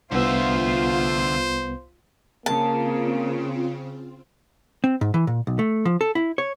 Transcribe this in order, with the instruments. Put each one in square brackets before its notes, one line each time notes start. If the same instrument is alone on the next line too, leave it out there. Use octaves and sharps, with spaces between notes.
[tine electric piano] C2 B3 [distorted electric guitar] D3 E5 [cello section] F4 [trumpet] C5
[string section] C#3 [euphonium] A#3 [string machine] C4 F4 [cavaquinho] A5
[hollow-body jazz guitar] C4
G#2
E3
A#2
B1
A3
F3
A4
E4
C#5